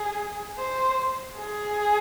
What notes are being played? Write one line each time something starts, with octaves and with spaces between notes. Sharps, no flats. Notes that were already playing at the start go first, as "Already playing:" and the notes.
Already playing: G#4
C5
G#4